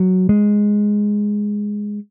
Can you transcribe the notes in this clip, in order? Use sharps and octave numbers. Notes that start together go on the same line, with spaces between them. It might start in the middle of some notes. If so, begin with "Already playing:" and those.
Already playing: F#3
G#3